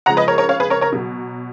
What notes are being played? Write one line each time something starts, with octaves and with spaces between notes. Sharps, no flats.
C#3 F3 G#3 F#5 A#5
B4 D#5
A#4 C#5
A#4 C#5
C#5 F5
G#4 B4
A#4 C#5
A#4 C#5
B2 F#3